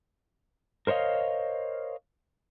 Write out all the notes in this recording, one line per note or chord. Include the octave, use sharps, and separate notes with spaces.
A#4 C5 C#5 D#5 F5